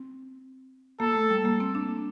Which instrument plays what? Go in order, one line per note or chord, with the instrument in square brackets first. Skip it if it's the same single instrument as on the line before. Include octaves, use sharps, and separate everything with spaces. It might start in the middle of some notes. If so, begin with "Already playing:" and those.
Already playing: [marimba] C4
[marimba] A#3 [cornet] A4
[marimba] A3
G3
A#3
C4
D4